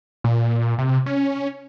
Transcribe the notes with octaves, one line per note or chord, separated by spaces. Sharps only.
A#2
C3
C#4